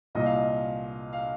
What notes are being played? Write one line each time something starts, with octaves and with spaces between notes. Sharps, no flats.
C2 A#2 D#5
F5
D#5
F5